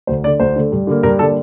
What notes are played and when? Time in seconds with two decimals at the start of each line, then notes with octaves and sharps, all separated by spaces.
0.07 D2 C5
0.23 D3 A3 D5
0.40 D2 C5
0.56 D3 A3
0.72 G2
0.87 D3 G3 A#3
1.03 G2 A#4
1.19 D3 G3 A#3 A4